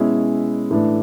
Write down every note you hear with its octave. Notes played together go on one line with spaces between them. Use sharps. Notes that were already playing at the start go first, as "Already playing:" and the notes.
Already playing: B2 G#3 C#4 E4
A2 E3 A3 D4